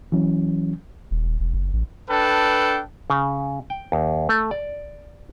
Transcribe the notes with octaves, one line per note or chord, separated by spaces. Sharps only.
E3 F#3 C#4
D#1
D#1
E1
F#1
A1
D4 A4 B4 G5
C#3
G5
D#2
A3
D5